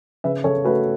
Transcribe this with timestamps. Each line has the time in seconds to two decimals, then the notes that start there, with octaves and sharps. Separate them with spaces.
0.24 C#3 B4 E5
0.44 C#3 A4 C#5
0.64 A3 F#4 B4